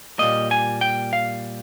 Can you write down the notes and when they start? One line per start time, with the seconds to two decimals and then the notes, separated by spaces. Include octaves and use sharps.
0.19 A#2 G3 A#3 D#5
0.51 G#5
0.81 G5
1.13 F5